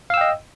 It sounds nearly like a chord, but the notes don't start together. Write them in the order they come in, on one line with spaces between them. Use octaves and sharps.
F5 E6 G5 D#5